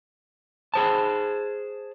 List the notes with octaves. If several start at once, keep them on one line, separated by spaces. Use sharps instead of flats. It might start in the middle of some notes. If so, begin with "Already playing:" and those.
G#4 C5 A5